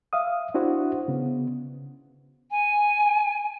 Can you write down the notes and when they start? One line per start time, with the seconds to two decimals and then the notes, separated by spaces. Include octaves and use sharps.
0.13 E5 F5 D#6
0.54 D4 E4 F#4 C5 F#5
1.08 C#3 B3
2.51 G#5